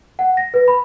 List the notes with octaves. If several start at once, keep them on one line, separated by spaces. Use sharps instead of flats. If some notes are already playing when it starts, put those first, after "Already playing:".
F#5
A#6
B4
B5